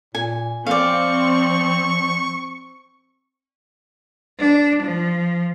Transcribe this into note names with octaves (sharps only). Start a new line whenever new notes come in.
A#2 G#5
F3 C4 D5 F5 C#6
D4
F3